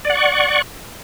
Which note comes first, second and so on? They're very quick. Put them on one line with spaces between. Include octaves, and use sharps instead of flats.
D5 F#5 C#6